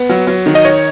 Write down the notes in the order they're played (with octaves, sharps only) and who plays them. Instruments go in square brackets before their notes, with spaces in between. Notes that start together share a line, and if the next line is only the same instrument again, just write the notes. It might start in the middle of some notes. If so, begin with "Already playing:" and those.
Already playing: [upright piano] B3
F#3
F#3
D#3
[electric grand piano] D#5
[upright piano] D#4 [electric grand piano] C#5